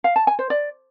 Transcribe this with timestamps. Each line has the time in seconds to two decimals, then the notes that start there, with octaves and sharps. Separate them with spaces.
0.04 F5
0.16 A5
0.27 G#5
0.39 C5
0.50 D5